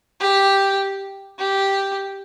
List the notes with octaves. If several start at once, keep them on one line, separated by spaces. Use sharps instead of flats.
G4
G4